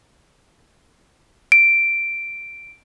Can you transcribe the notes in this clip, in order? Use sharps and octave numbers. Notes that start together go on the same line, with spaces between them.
D7